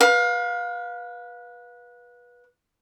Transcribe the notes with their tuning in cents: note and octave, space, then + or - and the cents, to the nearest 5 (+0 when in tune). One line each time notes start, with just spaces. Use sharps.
B4 -20 F5 +25